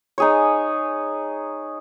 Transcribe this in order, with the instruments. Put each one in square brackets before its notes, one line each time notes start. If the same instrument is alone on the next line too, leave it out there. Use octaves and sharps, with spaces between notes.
[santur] D#4 G#4 C#5